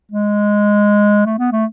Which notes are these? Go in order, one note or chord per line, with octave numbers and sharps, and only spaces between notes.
G#3
A3
B3
A3